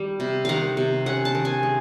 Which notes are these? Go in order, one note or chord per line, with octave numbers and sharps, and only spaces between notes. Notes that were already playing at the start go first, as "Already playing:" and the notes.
Already playing: D#3 G3
C3
D#3 F5 F#5
C3
C#4 F#5
A5
D#3
G#5
G#3